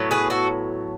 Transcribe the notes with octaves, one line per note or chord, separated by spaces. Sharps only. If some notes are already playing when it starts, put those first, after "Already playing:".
Already playing: A2 F#3 B3
G#4 B4
F#4 A4